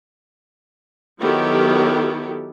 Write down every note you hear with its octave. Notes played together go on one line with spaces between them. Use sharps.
D#3 F#3 B3 E4 G4 A4